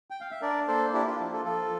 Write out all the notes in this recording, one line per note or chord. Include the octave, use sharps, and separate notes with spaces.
G5
F5
E5
D4 A#4 D5
A#3 A4 C5
D4 E4 G4
D4 F4
F3
F4 A4
F3 F4 A4